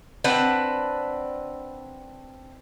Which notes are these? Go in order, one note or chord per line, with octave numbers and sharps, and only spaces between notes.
C4 D4 B4 F#5